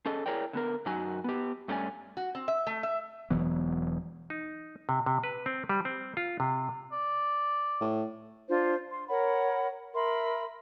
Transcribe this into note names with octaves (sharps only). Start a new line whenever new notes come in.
C#4 G#4 A4 D#5
E4 G#4 A#4 C#5 D5 G5
D3 B3 A#4
F#2 F#3 D#4 F#4 G#5
B3 G4
G2 A3 C#4 G#4 D5 G#5
F#4
C4
E5
A3
E5
E1 E3 F#3 B3
D#4
C3
C3
B4
C4
G3
C4
F4
C3
D5
A2
D4 F4 C5
C6
A#4 C#5 F#5 B5
A#4 E5 B5 C6